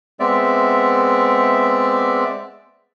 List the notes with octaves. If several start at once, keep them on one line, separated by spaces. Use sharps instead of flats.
G#3 B3 C4 D5 E5